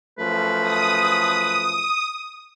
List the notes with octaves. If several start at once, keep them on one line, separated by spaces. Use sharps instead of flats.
F#2 F3 A3 B4
D#6